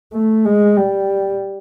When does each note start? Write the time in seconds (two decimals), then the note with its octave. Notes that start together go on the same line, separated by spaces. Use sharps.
0.13 A3
0.45 G#3
0.77 G3